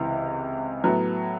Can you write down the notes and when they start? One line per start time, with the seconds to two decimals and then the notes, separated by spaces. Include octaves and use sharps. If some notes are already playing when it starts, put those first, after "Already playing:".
Already playing: C#2 C3 E3
0.84 A2 F#3 B3